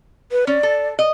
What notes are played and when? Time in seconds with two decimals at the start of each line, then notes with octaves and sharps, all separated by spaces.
0.32 B4
0.47 C#4 D5
0.63 A4
0.99 D#5